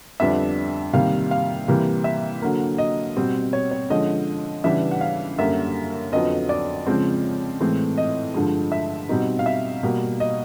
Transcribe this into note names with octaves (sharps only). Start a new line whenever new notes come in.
F2 D3 G3 B3 D4 E5
C3 D#3 G3 A#3 F5
F5
C3 E3 G3 A#3
E5
D3 F#3 A#3
D#5
B2 G3 C4
C#5
C#5
D3 F3 G#3 C#4 D#5
C#3 E3 G3 B3 D4 E5
F#5
F5
F#2 D3 G3 A#3 E5
F2 D3 F#3 B3 D#5
D5
C#3 F3 G#3 C4
A2 E3 G#3 C4
D#5
G2 D3 F3 G#3
E5
B2 G3 C4 D#4
F5
E5
B2 G3 A#3
D#5